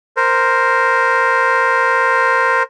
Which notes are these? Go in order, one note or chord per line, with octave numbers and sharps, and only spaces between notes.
A#4 C5